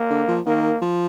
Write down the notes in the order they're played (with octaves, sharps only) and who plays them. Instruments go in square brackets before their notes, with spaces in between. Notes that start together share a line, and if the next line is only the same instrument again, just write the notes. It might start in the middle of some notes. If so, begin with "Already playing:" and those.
Already playing: [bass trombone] A#3
[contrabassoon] D3
F3
[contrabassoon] D#3 [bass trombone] A#3
[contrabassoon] F3